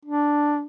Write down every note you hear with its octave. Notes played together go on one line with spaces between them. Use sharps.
D4